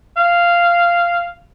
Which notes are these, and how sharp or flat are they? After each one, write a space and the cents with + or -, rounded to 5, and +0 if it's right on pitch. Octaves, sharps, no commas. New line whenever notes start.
F5 -10